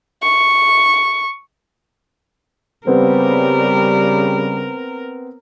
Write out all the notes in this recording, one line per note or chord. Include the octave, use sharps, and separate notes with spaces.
C#6
C#3 G3 B3 C4 A#4